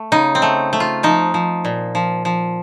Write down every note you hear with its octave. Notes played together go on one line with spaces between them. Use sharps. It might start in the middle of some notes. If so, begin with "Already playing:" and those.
Already playing: A3
C#3 D#4
C4
A3
A3
F4
F3 D#4
F3
A#2
F3
F3